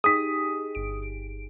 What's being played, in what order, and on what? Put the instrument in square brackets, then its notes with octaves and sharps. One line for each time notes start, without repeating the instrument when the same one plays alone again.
[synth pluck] D#4 G4 G#4 [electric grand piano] D#6 B6
[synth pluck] G1 D7